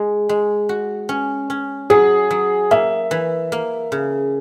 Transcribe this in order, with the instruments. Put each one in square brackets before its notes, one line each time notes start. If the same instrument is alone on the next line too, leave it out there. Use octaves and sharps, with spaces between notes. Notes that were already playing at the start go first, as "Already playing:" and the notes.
Already playing: [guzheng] G#3
G#3
F#4
C#4
C#4
[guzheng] F#3 [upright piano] G#4
[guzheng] F#3
[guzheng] A#3 [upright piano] E5
[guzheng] E3
A#3
C#3